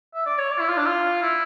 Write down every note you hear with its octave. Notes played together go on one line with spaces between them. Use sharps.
E5
D5
C#5
D5
E4
F4
D4
F4
E4